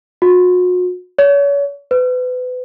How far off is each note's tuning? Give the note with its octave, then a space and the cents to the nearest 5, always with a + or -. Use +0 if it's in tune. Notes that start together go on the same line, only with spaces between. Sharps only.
F#4 -40
C#5 +35
B4 +30